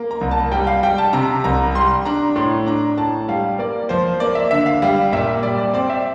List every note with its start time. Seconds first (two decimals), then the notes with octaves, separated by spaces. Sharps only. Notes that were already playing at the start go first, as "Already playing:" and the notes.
Already playing: A#3
0.11 A#5
0.21 C2
0.31 A5
0.52 G3 G5
0.67 F5
0.83 G3 G5
0.98 A5
1.13 C3 A#5
1.44 C2 A#5
1.75 G3 C6
2.05 D4 A#5
2.36 A2 C6
2.66 D4 A#5
2.98 A2 A5
3.28 G3 F5
3.59 A#3 D5
3.89 F3 C5
4.20 A#3 D5
4.35 E5
4.51 D3 E5
4.66 F5
4.82 G3 F5
5.13 A#2 E5
5.43 G3 D5
5.58 D5
5.74 C4 D5
5.90 E5